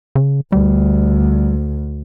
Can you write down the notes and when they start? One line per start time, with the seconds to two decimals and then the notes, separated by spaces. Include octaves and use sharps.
0.15 C#3
0.52 D2 G3